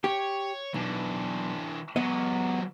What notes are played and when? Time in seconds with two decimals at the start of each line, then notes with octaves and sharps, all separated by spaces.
0.04 G4 C#5
0.74 B1 E3 D4
1.96 F#3 G#3 B3 D#5